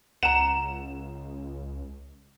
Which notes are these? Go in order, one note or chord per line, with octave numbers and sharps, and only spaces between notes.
C#2 F#5 A#5 E7